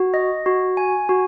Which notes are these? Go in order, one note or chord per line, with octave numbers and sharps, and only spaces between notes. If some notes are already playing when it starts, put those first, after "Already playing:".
Already playing: F#4
D#5
F#4
G#5
F#4